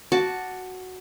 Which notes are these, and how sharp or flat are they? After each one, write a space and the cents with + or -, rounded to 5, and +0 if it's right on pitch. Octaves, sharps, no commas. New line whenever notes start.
F#4 +0 A5 +0 D6 +0